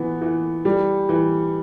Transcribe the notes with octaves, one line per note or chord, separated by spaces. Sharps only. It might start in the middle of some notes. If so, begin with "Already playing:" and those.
Already playing: E3 B3
E3
G3
E3